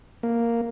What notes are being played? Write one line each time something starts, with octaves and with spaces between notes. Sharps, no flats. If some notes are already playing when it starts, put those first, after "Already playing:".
A#3